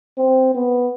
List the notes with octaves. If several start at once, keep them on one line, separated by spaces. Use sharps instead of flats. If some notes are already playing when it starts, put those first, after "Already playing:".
C4
B3